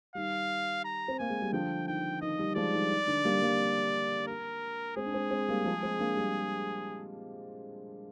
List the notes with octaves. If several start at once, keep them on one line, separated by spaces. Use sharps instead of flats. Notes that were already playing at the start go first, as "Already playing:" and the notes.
D#3 G3 F5
A#5
C4
A#3 G#5
G#3
G3
D3 F3 G5
D#3 G5
D#3 D#5
D#3 G3
F3 G#3 D5
D#3 G3
D#3
D3
G3 A#3
G3 A#3
A#4
G#3 C4 G#4
D4
G#3 C4
G#3 C4
G3 A#3
F3 G#3
G#3 C4
A#3 D4
G3 A#3